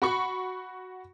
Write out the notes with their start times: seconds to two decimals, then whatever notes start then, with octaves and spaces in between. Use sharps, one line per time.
0.02 F#4 B5 C#6